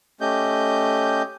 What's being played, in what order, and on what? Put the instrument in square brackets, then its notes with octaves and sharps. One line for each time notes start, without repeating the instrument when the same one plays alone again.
[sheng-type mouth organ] A3 C#4 G4 D#5 G6